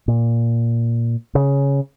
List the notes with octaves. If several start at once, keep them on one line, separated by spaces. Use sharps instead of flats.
A#2
C#3